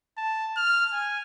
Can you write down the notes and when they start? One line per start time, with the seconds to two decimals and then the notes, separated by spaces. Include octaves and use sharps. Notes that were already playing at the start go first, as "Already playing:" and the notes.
0.17 A5
0.57 F6
0.93 G#5